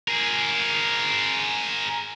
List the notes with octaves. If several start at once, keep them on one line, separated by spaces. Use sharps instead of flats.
G#4 A#4